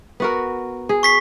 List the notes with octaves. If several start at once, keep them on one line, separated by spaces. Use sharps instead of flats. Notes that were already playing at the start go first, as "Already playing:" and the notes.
B3 F#4 A#4
G#4
C#6 B6 C7